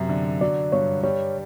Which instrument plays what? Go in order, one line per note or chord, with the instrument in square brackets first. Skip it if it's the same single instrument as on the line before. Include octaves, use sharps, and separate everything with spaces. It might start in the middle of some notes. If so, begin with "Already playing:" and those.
Already playing: [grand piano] F#2 C3 [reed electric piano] E5
[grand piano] D3
[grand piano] F#3 [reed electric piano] D5
[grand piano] G2 [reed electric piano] C#5
[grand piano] G3 [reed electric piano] C#5